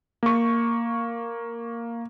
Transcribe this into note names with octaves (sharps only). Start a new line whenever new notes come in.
A#3 C#6